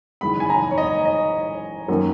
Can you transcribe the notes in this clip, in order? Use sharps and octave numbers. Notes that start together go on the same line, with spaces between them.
F#1 E2 D#3 G#3 B5
G#5
A#5
C#5
D#5
D#5
F#2 D#3 F#3 A#3